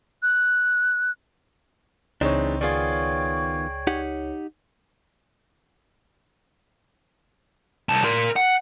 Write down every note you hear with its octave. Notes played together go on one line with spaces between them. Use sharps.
F#6
C#2 E3 G#3 C4 D4 D#4 C#5
D#3 B3 F4 G#4 D5 G5 C#6 G#6
D#4 G4 F#5
C2 A5
A#4 C6
F#5